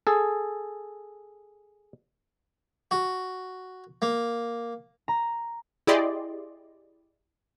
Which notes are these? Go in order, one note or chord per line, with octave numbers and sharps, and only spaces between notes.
G#4 A4
F#4
A#3
A#5
E4 G4 G#4 D5 D#5 C6